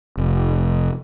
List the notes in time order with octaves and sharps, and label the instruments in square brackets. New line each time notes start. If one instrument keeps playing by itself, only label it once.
[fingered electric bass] F1